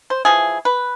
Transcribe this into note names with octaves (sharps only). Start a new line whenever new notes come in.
C5
E3 F3 G#4
B4